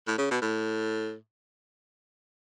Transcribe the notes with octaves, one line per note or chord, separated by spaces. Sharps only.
A2
C#3
B2
A2